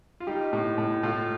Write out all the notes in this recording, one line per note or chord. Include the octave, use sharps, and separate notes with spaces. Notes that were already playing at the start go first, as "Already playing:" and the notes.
F4
G3 D#4 G4
A2
A2
A2 F4 A4